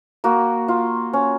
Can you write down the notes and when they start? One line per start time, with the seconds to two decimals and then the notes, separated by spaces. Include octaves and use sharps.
0.24 A#3 F#4
0.68 F4
1.13 C#4